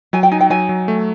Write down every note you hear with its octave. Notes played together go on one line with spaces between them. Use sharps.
F#3 G#5
G5
D#4 G#5
G5
F#3 G#5
F#3
A3